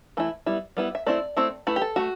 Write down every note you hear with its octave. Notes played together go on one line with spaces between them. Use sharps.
E3 A3 E4
G3 B3 E4
G3 B3 E4
E5
A3 C4 E4 D5
A3 C4 E4
A3 E4 B4
G4
A4
A3 F#4